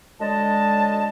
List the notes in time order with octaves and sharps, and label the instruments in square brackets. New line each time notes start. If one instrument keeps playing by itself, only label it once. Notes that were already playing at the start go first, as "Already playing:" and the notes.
[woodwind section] D3 F#3 G#3 D#5 A5